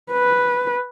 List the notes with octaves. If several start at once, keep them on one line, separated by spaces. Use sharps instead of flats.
B4